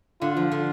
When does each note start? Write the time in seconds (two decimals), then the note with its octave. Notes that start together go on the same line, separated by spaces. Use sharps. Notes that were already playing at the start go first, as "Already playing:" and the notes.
0.21 D3 F4
0.37 F3
0.52 D3